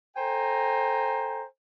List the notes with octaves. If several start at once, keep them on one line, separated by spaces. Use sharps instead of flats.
A4 C5 G5 G#5 A#5